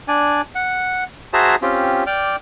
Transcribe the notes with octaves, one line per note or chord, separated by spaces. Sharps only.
D4 D5 G#5
F#5
F#4 G#4 C5 E5 A5 A#5
C4 C#4 F4 G4
D5 G5 D6 F6